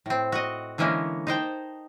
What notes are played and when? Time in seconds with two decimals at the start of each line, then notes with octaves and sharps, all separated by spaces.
0.06 A2 C4
0.32 F#4 D#5
0.78 D3 E3 G#3 A#3 C#4
1.27 D#4 C5 G5 A5